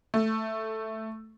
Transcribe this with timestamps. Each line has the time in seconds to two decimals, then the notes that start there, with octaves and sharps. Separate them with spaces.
0.14 A3